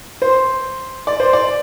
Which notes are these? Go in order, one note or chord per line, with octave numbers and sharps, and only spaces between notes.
C5
D5
C5
D5